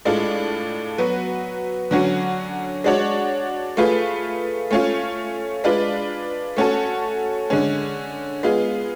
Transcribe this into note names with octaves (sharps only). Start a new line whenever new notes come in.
A2 G#3 D4 F4 A4
F#3 B3 F#4 B4
D3 F#3 C#4 F#4
G#3 D4 F#4 C#5
A3 F4 G#4 B4
A3 C#4 F4
G#3 D4 F4 B4
A3 C#4 F#4 A4
D3 G#3 C#4
G#3 B3 F4 G#4